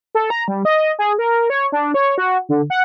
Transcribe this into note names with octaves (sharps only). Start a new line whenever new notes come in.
A4
A#5
G3
D#5
G#4
A#4
C#5
D4
C#5
F#4
D3
F#5